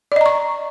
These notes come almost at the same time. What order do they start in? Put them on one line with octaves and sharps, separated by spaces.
D5 D#5 A#5 C#6